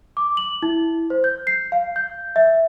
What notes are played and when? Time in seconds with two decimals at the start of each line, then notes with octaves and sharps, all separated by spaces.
0.17 D6
0.37 F#7
0.63 E4
1.10 C5
1.24 G6
1.47 C7
1.72 F5
1.96 G6
2.36 E5